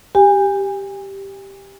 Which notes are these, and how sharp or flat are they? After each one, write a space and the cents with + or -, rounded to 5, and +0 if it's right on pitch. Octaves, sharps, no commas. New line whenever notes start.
G4 +0 G#5 -30